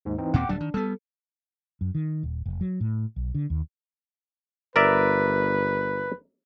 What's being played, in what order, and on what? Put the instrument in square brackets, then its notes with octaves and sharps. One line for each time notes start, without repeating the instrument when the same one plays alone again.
[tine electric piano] D#2 G#2
E3 C4 D#4
[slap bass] D#2 A#2 C4 [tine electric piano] F#5 G5 D6
[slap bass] D1 F#3 G3 [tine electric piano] D4
[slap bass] D#3
[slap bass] G3 B3 [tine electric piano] A4
[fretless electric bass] F#2
D#3
D#1
F1
F#3
A2
B1
D3
D#2
[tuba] G1 [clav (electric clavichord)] A#4 D5 E5 [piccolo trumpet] B4